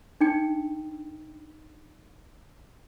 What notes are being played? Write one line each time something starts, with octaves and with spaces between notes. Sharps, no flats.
D4 D#4 G5